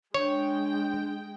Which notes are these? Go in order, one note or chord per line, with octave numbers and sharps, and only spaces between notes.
G#3 D4 C#5 G5